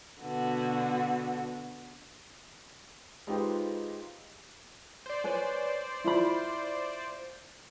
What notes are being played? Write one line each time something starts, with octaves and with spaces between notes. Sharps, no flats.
B2 D3 B3 F#4
G#3 D#4 F4 G4 B4 C5
C5 D5
B4 C#5 G#5
E4 F4 B5